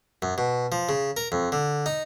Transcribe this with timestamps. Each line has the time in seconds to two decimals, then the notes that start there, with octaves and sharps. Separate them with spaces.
0.22 F#2
0.38 B2
0.72 F3
0.89 C#3
1.17 A#4
1.32 F2
1.52 D3
1.86 D#4